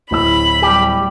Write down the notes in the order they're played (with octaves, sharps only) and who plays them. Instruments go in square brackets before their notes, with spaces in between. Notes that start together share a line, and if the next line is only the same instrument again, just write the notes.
[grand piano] D1 A2 E6 [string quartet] B5
[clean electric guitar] G3 G4